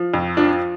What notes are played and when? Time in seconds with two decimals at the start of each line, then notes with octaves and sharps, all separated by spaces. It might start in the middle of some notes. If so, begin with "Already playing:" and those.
Already playing: F3
0.14 F2
0.37 F3 D4